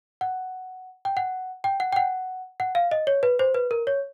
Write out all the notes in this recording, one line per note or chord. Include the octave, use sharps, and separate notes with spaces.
F#5
G5
F#5
G5
F#5
G5
F#5
F#5
F5
D#5
C#5
B4
C5
B4
A#4
C#5